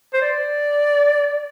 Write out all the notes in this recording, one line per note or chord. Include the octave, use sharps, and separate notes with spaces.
C5
D5